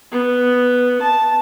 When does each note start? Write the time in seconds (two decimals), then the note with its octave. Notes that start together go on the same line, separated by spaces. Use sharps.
0.12 B3
1.01 A5